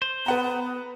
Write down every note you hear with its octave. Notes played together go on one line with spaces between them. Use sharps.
C5
B3 B4 F#5 A#5